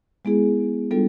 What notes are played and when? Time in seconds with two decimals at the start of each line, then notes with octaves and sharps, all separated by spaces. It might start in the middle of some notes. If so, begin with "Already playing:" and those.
0.25 G#3 B3 E4 G#4
0.91 G3 B3 D4 F4 A4